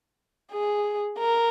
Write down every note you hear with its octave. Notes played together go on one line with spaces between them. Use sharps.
G#4
A#4